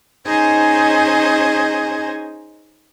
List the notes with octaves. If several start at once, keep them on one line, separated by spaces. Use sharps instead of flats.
C#4 D#4 G#4 C5 D#5 G#5